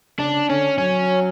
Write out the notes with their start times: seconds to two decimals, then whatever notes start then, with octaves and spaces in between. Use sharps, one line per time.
0.19 C#3 D4
0.49 D3 C#4
0.78 F#3 C#4